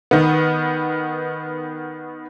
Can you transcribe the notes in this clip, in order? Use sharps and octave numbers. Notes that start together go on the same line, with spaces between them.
D#3 B3